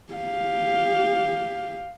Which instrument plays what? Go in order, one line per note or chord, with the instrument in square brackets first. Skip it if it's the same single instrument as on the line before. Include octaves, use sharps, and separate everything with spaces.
[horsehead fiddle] G4 F5